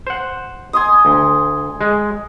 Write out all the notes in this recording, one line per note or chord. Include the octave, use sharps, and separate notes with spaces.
C5 F#5
G#5 C6 D#6
D2
G#3